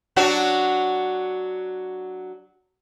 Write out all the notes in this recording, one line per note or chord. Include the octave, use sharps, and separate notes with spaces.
F#3 D4 F#4